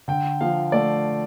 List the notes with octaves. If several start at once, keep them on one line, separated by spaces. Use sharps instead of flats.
D3 G5
F3 F5
A3 D5